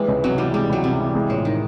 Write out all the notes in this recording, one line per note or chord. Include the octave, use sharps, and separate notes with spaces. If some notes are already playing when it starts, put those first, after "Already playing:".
Already playing: E3 G3 G#3
C#2
C3 F#3
E3 G3
G3 G#3
C#2 F#3
C3 G3
E3
G#3
A1 F3
D#3